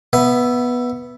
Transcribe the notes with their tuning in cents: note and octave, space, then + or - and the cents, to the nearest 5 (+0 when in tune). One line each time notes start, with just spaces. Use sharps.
B3 -5 E5 +10